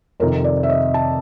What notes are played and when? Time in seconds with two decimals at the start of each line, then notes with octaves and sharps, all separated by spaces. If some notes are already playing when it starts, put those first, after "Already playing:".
0.20 F2 A#4
0.23 C3 D#3
0.44 D5
0.63 E5
0.70 D#5
0.94 A5